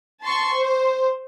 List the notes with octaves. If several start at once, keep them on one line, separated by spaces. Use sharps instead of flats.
A5 C6 C#6
C5